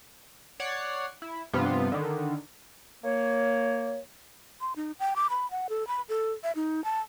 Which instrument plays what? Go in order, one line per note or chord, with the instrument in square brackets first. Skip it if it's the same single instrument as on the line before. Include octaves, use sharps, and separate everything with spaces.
[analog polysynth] C#5 D5 F#5 C7
E4
G2 C3 F3 B3 F4
D3 D#3
[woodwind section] A#3 C#5
[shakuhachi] C6
D#4
G5
D6
B5
F#5
A4
B5
A4
E5
D#4
A5